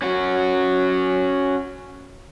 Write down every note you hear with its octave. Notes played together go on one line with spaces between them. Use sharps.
C#4 F#4